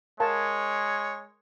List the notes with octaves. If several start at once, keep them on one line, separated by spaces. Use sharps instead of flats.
G#3 A#4 C#5 F5 A5